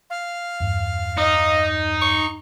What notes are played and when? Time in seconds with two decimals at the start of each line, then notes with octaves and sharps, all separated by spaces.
0.10 F5
0.60 E2 G2
1.17 D#4 D#5
2.02 C#6